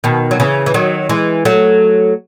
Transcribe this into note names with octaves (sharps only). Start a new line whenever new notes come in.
B2 D#3
F#3
C#3 E3
E3
D#3 F#3
E3 G#3
F#3 A3